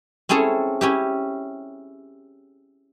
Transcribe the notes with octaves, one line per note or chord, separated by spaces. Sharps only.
C4 C#4 E4 G#4 A4 C#5
C#4 E4 G4